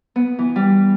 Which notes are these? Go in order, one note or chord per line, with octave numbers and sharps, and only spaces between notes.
B3
E3
G3